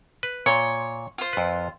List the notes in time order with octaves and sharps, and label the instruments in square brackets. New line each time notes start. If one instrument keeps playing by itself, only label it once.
[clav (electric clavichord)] B4
[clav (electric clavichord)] A#2 [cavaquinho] C#5 C6
[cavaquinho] F4 C5
[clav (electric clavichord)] F2 B4